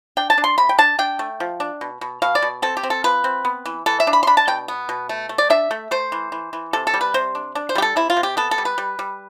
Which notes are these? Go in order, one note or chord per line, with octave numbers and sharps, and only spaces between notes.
D4 G5
A5
D4
C6
C3 B5
G5
D4 A5
D4 G5
A3
F3
D4
B2
B2
B2 F5
D5
B2
C4 A4
G4
C4
A4
F3 B4
C4
B3
E3
E3 A4
E5
D4
B5
C6
D4 B5
A5
B2 G5
B3
B2
A3
A3
D5
D4 E5
A3
A3 C5
E3
E3
E3
C3 A4
A4
G3
B4
C3 C5
D4
D4
C5
G3 G4
A4
C3 E4
F4
C3
G4
B3 A4
A4
G3
B4
G3
G3